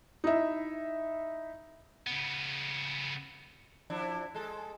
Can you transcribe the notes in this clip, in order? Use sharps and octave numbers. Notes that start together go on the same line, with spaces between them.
D#4 E4 E5
C#3 B3
F3 D4 E4
G#3 A4